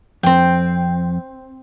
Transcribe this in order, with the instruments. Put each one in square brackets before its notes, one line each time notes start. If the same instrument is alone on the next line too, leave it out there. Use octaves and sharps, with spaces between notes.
[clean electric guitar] F2 [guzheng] C4 G5